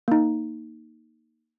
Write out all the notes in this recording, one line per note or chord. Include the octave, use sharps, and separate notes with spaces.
A#3 D#4